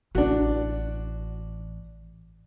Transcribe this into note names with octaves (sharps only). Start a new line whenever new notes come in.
A1 D4 F#4